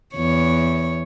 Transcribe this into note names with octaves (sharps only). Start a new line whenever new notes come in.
E2 C#5